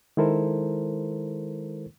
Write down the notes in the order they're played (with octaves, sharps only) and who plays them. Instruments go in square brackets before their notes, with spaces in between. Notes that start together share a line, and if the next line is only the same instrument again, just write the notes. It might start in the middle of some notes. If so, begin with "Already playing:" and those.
[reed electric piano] D#3 G#3 E4 A4 A#4 C5